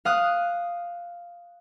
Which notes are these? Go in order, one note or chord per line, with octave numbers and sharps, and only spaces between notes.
F5 D#6 F#6